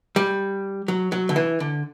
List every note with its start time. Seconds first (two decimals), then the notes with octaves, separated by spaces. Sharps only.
0.16 G3
0.88 F#3
1.12 F#3
1.29 D3
1.36 E3
1.60 D3